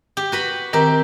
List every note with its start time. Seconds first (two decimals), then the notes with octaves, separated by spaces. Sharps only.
0.17 G4
0.32 F#4 B4 B5
0.73 D#3 C4 G4 A#4 A#5